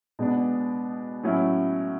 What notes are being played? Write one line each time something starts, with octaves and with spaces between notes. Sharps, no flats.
B2 G#3 B3 D4
A2 F#3 C#4 E4